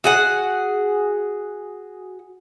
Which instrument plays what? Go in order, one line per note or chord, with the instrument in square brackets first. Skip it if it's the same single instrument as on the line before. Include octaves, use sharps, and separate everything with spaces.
[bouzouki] F#4 G#4 F#5